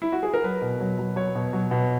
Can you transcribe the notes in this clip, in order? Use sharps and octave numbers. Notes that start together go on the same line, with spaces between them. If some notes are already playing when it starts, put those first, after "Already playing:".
E4
F#4
G#4
A#4
F#3 B4
B2
F#3
F#3
F#3 C#5
B2
F#3
B2